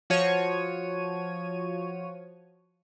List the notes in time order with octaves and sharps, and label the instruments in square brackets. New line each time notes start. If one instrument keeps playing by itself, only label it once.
[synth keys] F3 F#4 C#5 D#7